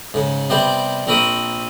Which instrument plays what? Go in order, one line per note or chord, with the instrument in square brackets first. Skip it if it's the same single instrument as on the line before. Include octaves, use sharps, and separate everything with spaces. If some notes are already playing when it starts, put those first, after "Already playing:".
[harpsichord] G#2 C#3
C3 G3 B3 G4 C5 D5
A#1 C4 A#4 B5 C#6 D#6